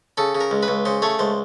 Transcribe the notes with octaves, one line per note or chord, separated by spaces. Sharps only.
C#3 A4
C#3
A#4
C#2
B4
C#2
C#3 C5
A3 C#5
C#2 C5